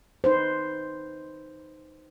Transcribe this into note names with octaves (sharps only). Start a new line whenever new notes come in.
D#4 B4 C5